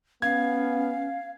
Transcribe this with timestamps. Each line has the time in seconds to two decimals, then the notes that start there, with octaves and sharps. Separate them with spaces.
0.22 B3 C#4 F5 G#6